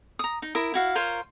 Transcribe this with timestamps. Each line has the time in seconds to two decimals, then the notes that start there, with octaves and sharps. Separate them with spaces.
0.19 A#5 D#6
0.42 D#4
0.55 E4 A#4 D#6
0.74 E4 F#4 F5
0.95 F4 A#4 C5 C#5